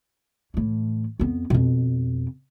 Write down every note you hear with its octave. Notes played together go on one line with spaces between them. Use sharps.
A2 E3
F2 B3
F2 B2